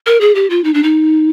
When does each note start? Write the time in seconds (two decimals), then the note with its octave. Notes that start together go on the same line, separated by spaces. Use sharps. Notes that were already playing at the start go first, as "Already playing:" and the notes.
0.06 A#4
0.21 G#4
0.35 G4
0.50 F4
0.64 D#4
0.74 D4
0.83 D#4